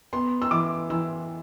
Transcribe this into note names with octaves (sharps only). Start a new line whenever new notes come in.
B3 C6
E6
E3 D6
E3 E6